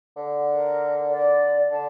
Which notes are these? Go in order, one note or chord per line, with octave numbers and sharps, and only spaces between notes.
D3
A#4
D5
D3 A5